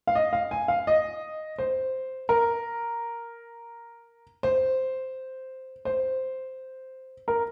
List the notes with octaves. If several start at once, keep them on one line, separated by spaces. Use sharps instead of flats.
F5
D#5
F5
G#5
F5
D#5
C5
A#4
C5
C5
A#4